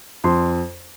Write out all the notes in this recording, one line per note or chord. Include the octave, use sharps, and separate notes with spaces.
F2 C6